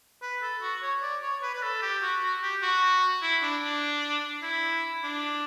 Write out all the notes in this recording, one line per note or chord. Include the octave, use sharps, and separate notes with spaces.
B4
A4
F#4
C#5
D5
C#5
B4
B4
A4
G4
F#4
F#4
G4
F#4
E4
D4
D4
E4
D4